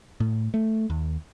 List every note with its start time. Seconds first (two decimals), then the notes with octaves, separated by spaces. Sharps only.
0.20 A2
0.54 A3
0.90 D#2